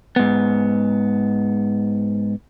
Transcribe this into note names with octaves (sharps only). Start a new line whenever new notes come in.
G#2 B3